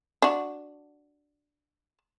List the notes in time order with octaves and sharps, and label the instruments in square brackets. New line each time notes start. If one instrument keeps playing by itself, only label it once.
[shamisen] D4 F#4